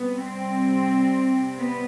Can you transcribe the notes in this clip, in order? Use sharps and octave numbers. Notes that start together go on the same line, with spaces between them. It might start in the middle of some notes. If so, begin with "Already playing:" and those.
Already playing: C3 G3 B3
C4
B3